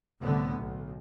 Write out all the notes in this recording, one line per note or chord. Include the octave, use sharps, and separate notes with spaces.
C2 A2 D3 B3
B1